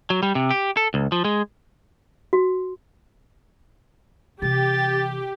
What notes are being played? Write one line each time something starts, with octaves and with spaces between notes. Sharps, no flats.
F#3
G3
C3
G4
A4
C#2
F3
G#3
F#4
C3 E3 G4 A6